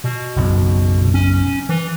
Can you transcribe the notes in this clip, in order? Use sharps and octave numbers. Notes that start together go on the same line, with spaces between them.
B2
F#1 B1 F#2
C#4
E3